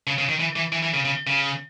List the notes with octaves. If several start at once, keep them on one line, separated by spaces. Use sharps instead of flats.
C#3
C#3
D#3
E3
E3
E3
E3
C#3
C#3
C#3